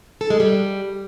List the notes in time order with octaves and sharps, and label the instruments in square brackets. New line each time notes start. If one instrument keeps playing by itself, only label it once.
[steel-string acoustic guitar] A4
G#3
G3